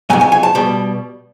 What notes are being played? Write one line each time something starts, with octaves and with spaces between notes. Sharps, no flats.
F2 C#3 F#3 G#5
G#5
G#5
A5
B2 G3